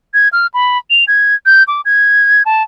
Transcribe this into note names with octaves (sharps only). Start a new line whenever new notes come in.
G#6
F6
B5
F7
G#6
G6
D6
G#6
A5